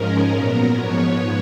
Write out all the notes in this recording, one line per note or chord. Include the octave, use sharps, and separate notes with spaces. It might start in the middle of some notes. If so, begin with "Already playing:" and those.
Already playing: G#2 F3 G#3 C#4 A#4
A#2 F#3 B3
G#2 F3 B3 C#5